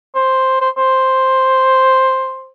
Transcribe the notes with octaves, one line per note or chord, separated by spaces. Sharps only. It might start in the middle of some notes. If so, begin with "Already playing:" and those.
C5
C5
C5